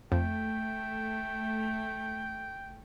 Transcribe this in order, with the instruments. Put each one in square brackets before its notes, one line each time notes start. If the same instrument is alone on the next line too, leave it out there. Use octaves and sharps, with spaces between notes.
[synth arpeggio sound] F2 [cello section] A3 [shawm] G5